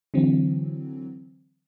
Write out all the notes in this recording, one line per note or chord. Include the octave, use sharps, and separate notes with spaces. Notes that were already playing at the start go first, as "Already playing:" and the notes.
D3 E3 F#3 C4